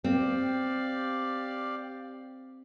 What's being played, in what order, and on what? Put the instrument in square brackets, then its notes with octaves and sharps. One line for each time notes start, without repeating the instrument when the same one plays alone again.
[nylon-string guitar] C4 [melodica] G4 D5 F5